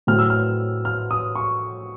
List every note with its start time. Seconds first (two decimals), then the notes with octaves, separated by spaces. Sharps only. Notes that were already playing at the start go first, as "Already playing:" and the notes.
0.07 A2 F#3 A3 C4 F6
0.19 E6
0.30 F6
0.85 F6
1.11 D#6
1.35 C#6